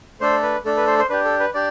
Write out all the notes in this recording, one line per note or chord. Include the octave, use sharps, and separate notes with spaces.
A3 D4 A4 C5
B4
A3 D4 A4
B4
C5
C5
D4 G4 B4
A4
B4
D4 G4 D5